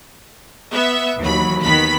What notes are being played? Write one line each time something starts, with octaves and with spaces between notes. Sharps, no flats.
B3 E5
D#2 E3 F#3 B5
D#2 D#3 B3 B5 B6